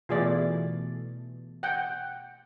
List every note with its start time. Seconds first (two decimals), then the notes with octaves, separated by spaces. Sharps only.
0.09 B2 E3 A3 F4 G#4 D5
1.63 F#5 G5